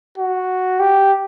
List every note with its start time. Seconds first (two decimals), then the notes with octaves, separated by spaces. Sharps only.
0.18 F#4
0.80 G4